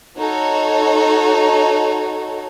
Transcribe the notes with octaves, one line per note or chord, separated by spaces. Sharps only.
D#4 F#4 A4 C#5